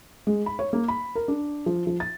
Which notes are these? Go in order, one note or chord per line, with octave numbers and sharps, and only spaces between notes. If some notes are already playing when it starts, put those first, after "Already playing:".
G#3
B5
C#5
A#3
B5
A#4
D4
F3
F3
A6